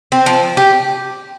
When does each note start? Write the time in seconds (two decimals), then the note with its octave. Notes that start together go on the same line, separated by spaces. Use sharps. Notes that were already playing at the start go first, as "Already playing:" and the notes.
0.12 C4
0.26 F3
0.57 G4